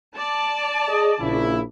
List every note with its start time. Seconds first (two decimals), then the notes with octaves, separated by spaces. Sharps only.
0.15 D5 A5
0.88 G#4 D#5
1.20 A#1 C#3 E4